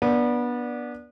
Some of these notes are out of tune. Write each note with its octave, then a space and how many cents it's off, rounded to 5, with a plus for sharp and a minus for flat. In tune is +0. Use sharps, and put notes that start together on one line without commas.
B3 -25 D4 +0 D5 -5